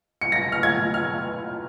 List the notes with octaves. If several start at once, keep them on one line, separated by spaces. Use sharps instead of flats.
C#7
A#6
F6
G#6
F6